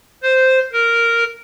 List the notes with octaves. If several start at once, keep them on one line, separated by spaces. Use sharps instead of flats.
C5
A#4